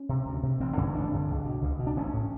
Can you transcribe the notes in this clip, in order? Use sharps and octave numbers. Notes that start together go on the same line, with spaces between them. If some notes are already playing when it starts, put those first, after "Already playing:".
Already playing: C#4
C3
D2
C3
A1 C4
G2 D3 C#4
A1 D4
G2 D3
C#2
B2
C#2
B2
D4
A1 C#4
A2